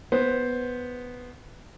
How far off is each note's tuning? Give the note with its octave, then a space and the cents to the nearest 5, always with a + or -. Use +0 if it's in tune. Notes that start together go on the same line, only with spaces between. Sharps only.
B3 +0 C5 +5